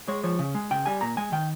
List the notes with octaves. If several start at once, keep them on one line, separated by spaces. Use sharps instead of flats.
G#3 C#5
F3 C#5
C#3
G#3
C#3 G5
G3 G#5
A#2 A#5
G#3 G#5
D#3 G5